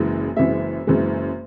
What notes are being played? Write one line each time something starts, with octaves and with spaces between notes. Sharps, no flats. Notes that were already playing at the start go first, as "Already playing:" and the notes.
Already playing: F#1 F#2 E3 G#3
F#1 F#2 E3 G#3 E5
F#1 F#2 E3 G#3